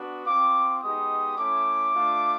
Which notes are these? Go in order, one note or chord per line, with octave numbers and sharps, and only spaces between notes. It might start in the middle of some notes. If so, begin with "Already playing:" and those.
Already playing: B3 D4 F#4
C4 F4 D6
G#3 B3 D#4 G4 D#6
A3 C#4 E4 D6
A3 D4 F4